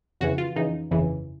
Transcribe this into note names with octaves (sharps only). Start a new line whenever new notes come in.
F2 C#3 E3 F#4
F4
F2 C#3 E3 D#4
G1 F2 C#3 E3